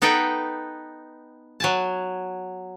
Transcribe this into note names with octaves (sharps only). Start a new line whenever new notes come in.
B3 D#4 A4 B4 G5
F#3 G#5 A5